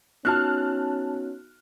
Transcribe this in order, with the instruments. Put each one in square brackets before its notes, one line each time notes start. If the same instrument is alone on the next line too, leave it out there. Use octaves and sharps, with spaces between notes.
[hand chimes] B3 D#4 F#4 [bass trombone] C#4 [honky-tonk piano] A5 F6 F#6